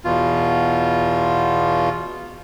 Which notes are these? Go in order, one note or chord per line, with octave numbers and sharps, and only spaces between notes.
E2 B2 F4